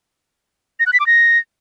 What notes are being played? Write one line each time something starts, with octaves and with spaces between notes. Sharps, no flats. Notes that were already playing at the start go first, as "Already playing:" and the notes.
A#6
F#6
B6
D6
A#6